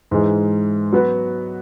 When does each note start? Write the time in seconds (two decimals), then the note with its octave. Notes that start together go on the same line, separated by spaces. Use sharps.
0.11 G#2 E3 G#3
0.92 F#3 B3 F#4 B4